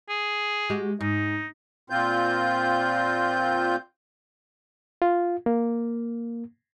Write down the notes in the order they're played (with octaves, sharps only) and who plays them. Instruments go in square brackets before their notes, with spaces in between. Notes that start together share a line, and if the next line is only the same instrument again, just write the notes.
[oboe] G#4
[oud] G#3 F#4 G4
[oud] G#2 [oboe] D#4
[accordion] A#2 C4 F4 G6
[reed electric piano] F4
A#3